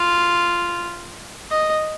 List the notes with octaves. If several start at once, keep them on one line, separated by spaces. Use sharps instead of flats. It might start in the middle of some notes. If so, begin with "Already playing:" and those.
Already playing: F4
D#5